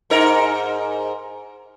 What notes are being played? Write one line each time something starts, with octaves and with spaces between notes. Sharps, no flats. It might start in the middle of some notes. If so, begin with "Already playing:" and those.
G#2 D#4 A#4